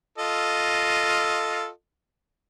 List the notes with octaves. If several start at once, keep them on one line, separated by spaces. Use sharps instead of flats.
F4 A4 D#5